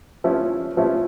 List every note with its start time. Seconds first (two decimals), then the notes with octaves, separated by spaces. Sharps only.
0.24 F3 A3 C#4 E4
0.77 F3 A3 C#4 E4